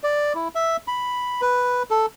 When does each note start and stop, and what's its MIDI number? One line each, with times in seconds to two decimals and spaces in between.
0.03 0.33 74
0.35 0.48 64
0.55 0.77 76
0.88 1.41 83
1.41 1.83 71
1.91 2.06 69